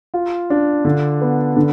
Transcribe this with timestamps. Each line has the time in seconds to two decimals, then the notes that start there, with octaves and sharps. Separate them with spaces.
0.14 F4
0.50 D4
0.85 D3
1.21 B3
1.57 D3